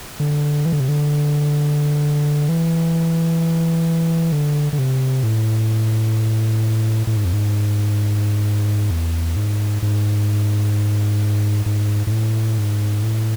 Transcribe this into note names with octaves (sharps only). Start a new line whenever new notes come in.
D3
E3
D3
C3
D3
E3
D3
D3
C3
A2
A2
G#2
F2
G#2
E2
G#2
G#2
G#2
G#2
A2
G#2
A2